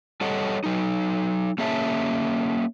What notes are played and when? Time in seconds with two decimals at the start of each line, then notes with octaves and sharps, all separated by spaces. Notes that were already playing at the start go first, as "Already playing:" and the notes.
0.21 G3 A4 C#5 D#5 F#5
0.64 F#3 D#4
1.58 A#3 C#4 G#4 C#5 E5 A5